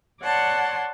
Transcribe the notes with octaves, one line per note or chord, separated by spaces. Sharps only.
C#5 D5 F#5 A5 C6